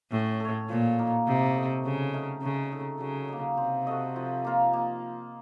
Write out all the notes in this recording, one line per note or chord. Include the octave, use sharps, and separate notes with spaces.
A2 C#4
A4 C#5
A#2 F3
A#3 D#4 A#4
C3 D#4
A4 D#5
C#3 F#3
A3 D#4 A#4
C#3 A3
D#4 A4
C#3 F#3
A#3 D#4
C3 C4
F#4 A4 D#5
F3
A#3 F4 A#4
A#3